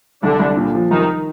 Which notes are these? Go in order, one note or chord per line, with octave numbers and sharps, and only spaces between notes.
C2 D3 D4
C2
A#2
F3
C2 D#3 D#4